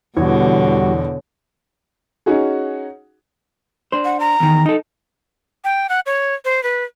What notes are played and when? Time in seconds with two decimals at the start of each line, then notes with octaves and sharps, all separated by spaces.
0.17 E2 B2 D3 G3 F#4 C#5
2.26 C#4 D#4 F#4 G#4
3.92 D4 C5
4.04 F#5
4.20 A#5
4.40 E2 D#3
4.66 D#4 A4
5.64 G5
5.89 F#5
6.06 C#5
6.45 C5
6.63 B4